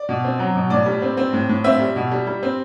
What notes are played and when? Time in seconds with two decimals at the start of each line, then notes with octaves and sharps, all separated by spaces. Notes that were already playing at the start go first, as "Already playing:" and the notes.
Already playing: D5
0.09 B2
0.24 C4
0.39 F#3
0.55 B2
0.70 A2 D5
0.86 G3
1.02 C4
1.17 C4
1.33 A2
1.49 A2
1.64 C4 E5
1.80 G3
1.96 B2
2.12 G3
2.27 G3
2.43 C4